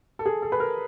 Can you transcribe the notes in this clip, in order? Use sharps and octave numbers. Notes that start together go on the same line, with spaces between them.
A4
G#4
A4
B4
A#4